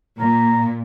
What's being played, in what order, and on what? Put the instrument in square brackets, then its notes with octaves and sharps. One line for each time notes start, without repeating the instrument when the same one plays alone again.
[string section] A#2 [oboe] A#5